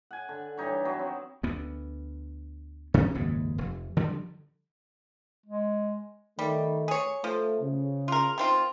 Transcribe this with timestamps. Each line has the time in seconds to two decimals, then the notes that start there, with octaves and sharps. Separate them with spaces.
0.11 F#5 G#5
0.29 D3
0.57 E3 G3 D#4 C#5
0.85 F#3 B3
0.99 C4
1.43 D2 B3
2.94 C3 C#4
3.15 F#1 D#2 G#2
3.58 F1
3.97 D3 F3 G3
5.46 G#3
6.39 D#3 G3 A3
6.88 G#4 C#5
7.24 F3 A3
7.60 C#3
8.08 F4 A#4
8.38 D#3 C4 F4